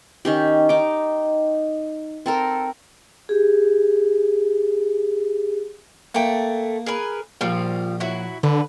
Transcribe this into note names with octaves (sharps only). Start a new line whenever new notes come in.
D#3 C#4 G4
D#4 D6
C4 A4 A#4
G4 G#4
A3 A#3 G5
G#4 A#4 B4
A#1 F3 G3
F#3 E4 F#4
D3 B4